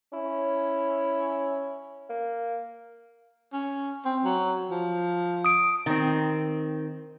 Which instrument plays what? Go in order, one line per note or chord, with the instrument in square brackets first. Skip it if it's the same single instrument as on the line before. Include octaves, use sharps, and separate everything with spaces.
[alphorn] C#4 [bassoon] E4
[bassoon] A#3
[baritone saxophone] C#4
C4
F#3
F3
[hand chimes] D#6 D7
[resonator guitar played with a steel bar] D#3 C4